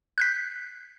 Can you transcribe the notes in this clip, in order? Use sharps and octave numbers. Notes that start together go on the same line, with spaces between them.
F#6 G6 B6